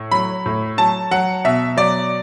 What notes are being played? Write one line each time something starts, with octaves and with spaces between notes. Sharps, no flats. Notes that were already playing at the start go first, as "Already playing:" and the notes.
Already playing: A2
F#3 B5
A2
F#3 A5
F#3 F#5
B2 E5
F#3 D5